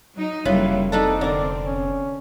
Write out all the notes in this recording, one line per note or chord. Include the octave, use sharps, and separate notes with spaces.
F#3 D#4
F1 C#3 F#3 G3 A#3 E4 F4 B4
C4 D4 D#4 A4 B4
D3 A#4 D5
C#4